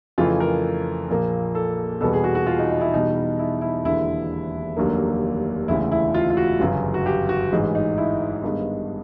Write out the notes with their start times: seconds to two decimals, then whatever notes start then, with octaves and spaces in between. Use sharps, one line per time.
0.18 F2 C#3 E3 A3 F4
0.40 A#4
1.09 A#1 A#2 F3 A#3
1.55 A4
2.01 E2 B2 G3 B3 A4
2.13 G#4
2.24 F#4
2.35 F#4
2.47 F4
2.59 D#4
2.70 D#4
2.81 E4
2.93 E2 B2 G3 B3 D#4
3.39 E4
3.61 E4
3.84 E1 D#2 D3 E4
4.76 F1 D#2 D3 F#3 A#3
5.68 E1 D2 C#3 E4
5.92 E4
6.14 F4
6.30 F4
6.37 F#4
6.60 G1 F#2 C#3
6.94 F#4
7.06 G4
7.29 F#4
7.52 A1 G#2 E3 G#3
7.75 D#4
7.98 E4
8.44 G2 D#3 G#3 B3